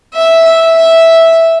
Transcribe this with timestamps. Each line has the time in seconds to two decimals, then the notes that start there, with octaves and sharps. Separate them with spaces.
0.14 E5
0.45 E5
0.76 E5